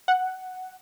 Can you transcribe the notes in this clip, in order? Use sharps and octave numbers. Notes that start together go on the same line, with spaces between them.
F#5